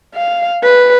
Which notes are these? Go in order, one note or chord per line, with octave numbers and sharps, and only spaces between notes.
F5
B4